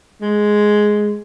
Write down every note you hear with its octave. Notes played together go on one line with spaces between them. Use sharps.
G#3